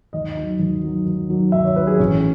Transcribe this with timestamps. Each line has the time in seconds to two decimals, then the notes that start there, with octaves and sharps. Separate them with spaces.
0.13 D#2 D#5
0.37 D#3 F#3
0.60 D#2
0.83 D#3 F#3
1.06 D#2
1.29 D#3 F#3
1.52 D#2 E5
1.65 C#5
1.76 D#3 F#3 B4
1.87 G#4
1.99 A1 C#4